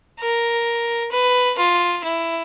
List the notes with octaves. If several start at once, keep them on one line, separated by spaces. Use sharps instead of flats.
A#4
B4
F4
E4